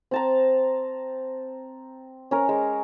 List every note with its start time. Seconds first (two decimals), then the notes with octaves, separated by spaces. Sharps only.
0.11 C4 A5 A#5
2.31 C#4 A#4
2.49 G#3